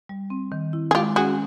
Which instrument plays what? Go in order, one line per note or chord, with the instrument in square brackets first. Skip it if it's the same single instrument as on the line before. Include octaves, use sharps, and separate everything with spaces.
[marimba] G3
C4
D#3
E4
[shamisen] G#4
[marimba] G#3 [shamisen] F4 G4
[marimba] C#4 [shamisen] F#4 G#4